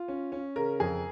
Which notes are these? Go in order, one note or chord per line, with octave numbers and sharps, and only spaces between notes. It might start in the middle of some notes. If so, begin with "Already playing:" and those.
Already playing: F4
C#4
C#4
C#3 A#4
F2 G#4